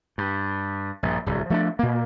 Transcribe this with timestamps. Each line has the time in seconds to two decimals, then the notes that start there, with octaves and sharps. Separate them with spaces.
0.18 G2
1.03 A#1 G2
1.26 D1 C2
1.50 F3 A3 C4 D4
1.79 A#2 A#3